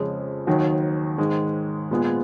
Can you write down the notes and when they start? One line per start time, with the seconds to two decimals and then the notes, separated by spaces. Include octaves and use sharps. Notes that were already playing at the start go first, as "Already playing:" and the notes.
Already playing: F2 C#3 G#3
0.47 D#2 D#3 F#3
1.18 G#2 D#3 G#3
1.91 A#2 G#3 B3 F4 G#4